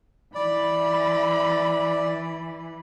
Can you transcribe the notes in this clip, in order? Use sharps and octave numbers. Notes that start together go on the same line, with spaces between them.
E3 D5 B5